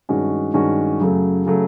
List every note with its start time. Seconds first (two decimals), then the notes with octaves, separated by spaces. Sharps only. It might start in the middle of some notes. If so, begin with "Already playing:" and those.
0.09 G2 D#3 G#3 C#4 F#4
0.54 G2 D#3 G#3 C#4 F#4
0.99 F#2 C#3 F#3 A3
1.46 C#3 F#3 A3